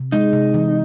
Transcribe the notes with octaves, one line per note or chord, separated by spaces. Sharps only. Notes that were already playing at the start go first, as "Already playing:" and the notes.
Already playing: C3
G#3 D#4
C3
E3